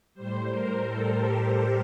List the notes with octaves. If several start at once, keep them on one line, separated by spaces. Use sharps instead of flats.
A2 G3 C5
A#4
A4
G4